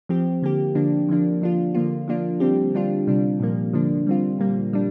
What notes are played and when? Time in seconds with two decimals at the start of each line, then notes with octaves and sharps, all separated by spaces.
0.09 F3 C4 G4
0.42 D3 A#3 G4
0.75 D3 F3 A#3 D4
1.08 D3 F3 A#3 D4
1.42 F3 D4 F4
1.75 D3 F3 A#3 F4
2.08 F3 A#3 D4 F4
2.40 D3 G3 C4 G4
2.74 G3 D4 F4
3.07 C3 G3 D4
3.40 A#2 F3 A#3
3.73 D3 F3 A#3 D4
4.07 G3 C4 F4
4.39 A#2 G3 A#3
4.73 G3 D4